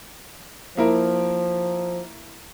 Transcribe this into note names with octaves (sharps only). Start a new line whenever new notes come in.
F3 A#3 E4 A#4